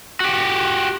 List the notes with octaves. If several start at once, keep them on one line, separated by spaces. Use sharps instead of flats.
F#4 G4